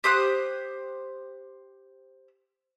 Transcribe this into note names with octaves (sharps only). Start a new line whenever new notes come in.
G4 C5 D#6 F#6